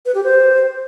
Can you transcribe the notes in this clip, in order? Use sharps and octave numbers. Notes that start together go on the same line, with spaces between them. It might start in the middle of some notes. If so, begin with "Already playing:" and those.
B4
G4
C5